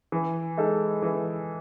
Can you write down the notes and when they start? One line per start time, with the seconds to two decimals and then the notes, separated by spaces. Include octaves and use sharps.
0.12 E3
0.57 G#3 D#4 A4
1.02 E3